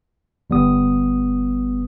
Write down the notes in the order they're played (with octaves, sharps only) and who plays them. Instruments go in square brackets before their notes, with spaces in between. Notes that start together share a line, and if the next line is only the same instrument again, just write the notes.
[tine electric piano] G1 G3 B3 D#6